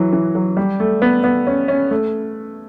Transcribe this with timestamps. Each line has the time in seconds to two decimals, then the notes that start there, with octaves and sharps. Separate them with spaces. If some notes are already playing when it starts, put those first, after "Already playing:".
Already playing: E3 F#3
0.13 E3
0.35 F#3
0.57 G3
0.80 A3
1.02 B3
1.24 B3
1.47 C#4
1.68 C#4
1.91 A3